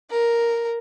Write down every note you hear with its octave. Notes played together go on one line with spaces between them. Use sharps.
A#4